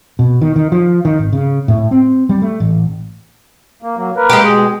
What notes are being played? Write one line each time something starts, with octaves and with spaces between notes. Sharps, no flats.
B2
D#3
D#3
F3
D#3
G#1
C#3
A2
C4
G3
A3
A1
A#3
F#3 A#3
A#3 A#4 B4
G#3 G4
B2 G#4